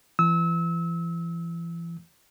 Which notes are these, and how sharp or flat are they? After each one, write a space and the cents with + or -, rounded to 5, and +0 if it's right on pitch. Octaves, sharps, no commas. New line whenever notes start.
E3 +35 E6 -30